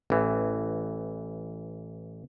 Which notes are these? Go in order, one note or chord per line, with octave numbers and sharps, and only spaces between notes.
A1 E3